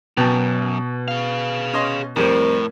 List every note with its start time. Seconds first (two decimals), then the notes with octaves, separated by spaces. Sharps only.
0.17 F#2 B2 G5 A5
1.08 G#4 F5
1.74 C#4 D#5 C6
2.16 F2 A2 G3 C4 A#4